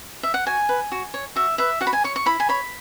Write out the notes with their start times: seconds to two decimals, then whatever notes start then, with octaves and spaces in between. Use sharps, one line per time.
0.23 E5
0.34 F#5
0.46 F#4 G#5
0.69 B4
0.92 F#4
1.14 C#5
1.36 F#4 E5
1.58 B4 E5
1.81 F#4 F#5
1.87 B5
1.93 G#5
2.04 C#5 C#6
2.16 C#6
2.26 E4 B5
2.40 G#5
2.49 C#5 B5